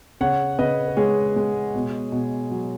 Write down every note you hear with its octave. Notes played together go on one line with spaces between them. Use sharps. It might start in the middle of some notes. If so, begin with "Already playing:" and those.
C#3 C#5 F#5
C#3 B4 D#5
B4
G#3 G#4 C#5
G#3
B2
B2
F#3